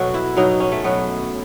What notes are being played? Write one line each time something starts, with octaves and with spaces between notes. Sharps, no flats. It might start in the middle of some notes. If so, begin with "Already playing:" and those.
Already playing: B2 F#3 F#4 A4
E4
B2 F#3 D#4
C#4
A3
B2 F#3 B3